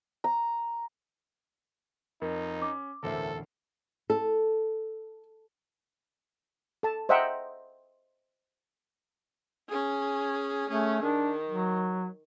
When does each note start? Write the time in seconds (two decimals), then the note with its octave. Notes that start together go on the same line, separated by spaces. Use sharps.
0.24 A#5
2.22 F2 D#4 A#4
2.62 C#4 D6
3.03 E1 A1 D2 A4 A#4 C5 E5
4.10 A4
6.83 A4 A5
7.09 C5 D#5 E5 F#5 G5 A#5
9.68 C#4 G#4
10.69 A3 C#4 G#4
11.02 D#3 D4
11.48 F#3